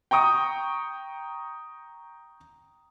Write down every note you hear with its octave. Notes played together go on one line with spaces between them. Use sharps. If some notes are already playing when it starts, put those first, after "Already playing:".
G5 A#5 C#6 D#6